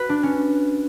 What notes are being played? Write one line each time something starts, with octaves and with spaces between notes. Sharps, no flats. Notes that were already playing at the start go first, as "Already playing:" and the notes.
Already playing: F#4 B4
D4
C#4